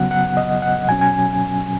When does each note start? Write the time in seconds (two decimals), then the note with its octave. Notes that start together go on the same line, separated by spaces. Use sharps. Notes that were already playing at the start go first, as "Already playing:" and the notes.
Already playing: C#3 F#3 B3 F#5
0.11 F#5
0.37 D#5
0.62 F#5
0.88 B2 F#3 C#4 G#5
1.01 G#5